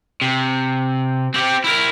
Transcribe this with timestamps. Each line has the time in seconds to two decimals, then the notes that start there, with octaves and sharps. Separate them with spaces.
0.21 C3
1.34 C4 G4
1.64 E4 A#4